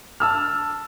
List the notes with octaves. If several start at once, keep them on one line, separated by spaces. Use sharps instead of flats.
A5 E6 F6